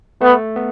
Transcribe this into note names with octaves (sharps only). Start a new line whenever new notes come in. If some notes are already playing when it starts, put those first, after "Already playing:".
A3 B3
B3